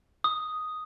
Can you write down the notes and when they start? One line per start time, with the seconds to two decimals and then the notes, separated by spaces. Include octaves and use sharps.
0.24 D#6